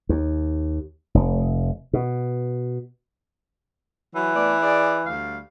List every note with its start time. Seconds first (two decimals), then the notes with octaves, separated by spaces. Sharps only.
0.09 D#2
1.15 F1
1.93 B2
4.15 E3 F#3
4.35 A3 B3 D5
4.62 G#4 D5
5.06 D2 G3 F5